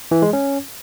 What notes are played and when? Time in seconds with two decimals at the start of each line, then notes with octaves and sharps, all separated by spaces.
0.11 E3
0.22 G#3
0.33 C#4